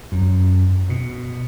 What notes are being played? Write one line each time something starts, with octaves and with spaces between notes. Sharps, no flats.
F#2
B2